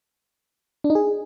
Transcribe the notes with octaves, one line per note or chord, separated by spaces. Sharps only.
D4
D#4
G#4